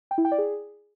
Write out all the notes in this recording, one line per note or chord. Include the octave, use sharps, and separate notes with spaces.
G5
E4
G5
D5
G#4